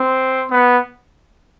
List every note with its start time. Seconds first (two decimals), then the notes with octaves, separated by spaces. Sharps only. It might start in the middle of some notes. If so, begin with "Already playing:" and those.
Already playing: C4
0.51 B3